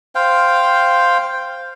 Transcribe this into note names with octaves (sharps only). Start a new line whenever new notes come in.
C5 F5 G5